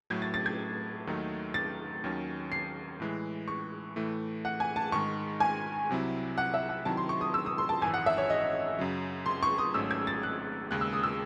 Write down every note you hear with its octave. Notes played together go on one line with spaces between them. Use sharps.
A2 F#3 A3 G#6
A6
A6
G#6
D#2 D#3 F#3 A3 D#4
A6
D#2 D#3 F#3 C#4
C7
A2 E3 G#3
C#6
A2 E3 A3
F#5
G#5
A5
G#2 D#3 G#3 C#6
G#5
C2 C3 F#3 C4 E4
F#5
E5
F#5
C3 D#3 F#3 C4 E4 A5
C6
C#6
D#6
E6
D#6
C6
A5
G#1 F#2 E3 G#5
F#5
E5
C#5
D#5
F#2 C#3 F#3
C6
C#6
D#6
G#1 G#2 F#3 A3 C#4 E6
G#6
A6
F#6
D#2 C#3 G#3 F#6
E6
D#6
E6